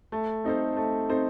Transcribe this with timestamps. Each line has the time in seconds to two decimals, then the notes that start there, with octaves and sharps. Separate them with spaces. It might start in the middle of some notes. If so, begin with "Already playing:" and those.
0.12 A3
0.44 C4 D#4 A4 C5
0.77 A3
1.09 C4 D#4 A4 C5